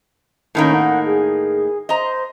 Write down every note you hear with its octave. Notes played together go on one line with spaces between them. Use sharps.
A2 D#3 A#3 C#4
F#5
G#4
C5 D#5 A#5